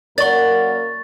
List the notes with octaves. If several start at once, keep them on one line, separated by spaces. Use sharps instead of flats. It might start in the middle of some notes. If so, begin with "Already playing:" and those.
F#2 A#3 A#4 D5 F#5 C#6 A6